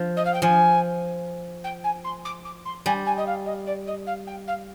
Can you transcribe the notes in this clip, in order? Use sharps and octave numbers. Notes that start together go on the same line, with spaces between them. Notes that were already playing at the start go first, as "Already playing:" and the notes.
Already playing: F3
D#5
F5
G5
F3 G#5
G5
G#5
C6
D6
D6
C6
G3 G#5
G#5
D#5
F5
D#5
D5
D#5
F5
G5
F5